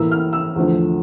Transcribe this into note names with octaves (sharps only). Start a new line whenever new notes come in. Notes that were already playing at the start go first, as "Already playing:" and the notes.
Already playing: A2 E3 A#3 E4 E6
F6
E6
E2 D3 F3 A3